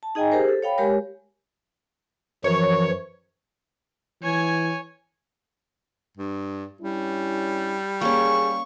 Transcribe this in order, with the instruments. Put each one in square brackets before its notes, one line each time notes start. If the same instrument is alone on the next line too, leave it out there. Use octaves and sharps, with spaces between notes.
[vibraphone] A5
D#4 G#4 D#5 G5 G#5 A#5
G4 G#4 A#4 C5
A4
C#5 F5 G5 B5
G#3 G4 A#4 C#5
[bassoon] F#2 [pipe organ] E3 F3 [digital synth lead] C#5
[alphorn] E3 [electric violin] C#5 G#5
[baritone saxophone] G2
[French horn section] G2 C#4 E4 [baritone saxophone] G3
[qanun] A#3 C#4 [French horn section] G#4 [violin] C#6